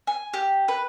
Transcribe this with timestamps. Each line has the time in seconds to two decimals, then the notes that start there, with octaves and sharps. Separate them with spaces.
0.07 G#5
0.34 G4
0.68 B4